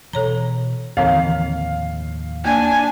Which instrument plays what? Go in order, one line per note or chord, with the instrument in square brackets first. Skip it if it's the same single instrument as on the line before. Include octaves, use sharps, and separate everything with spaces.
[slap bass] B2 E3 [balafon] A4 C#5 A#5
[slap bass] D#2 A2 F3 [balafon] D3 E3 C4 [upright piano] F5
[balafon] A#3 [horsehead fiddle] D4 G#5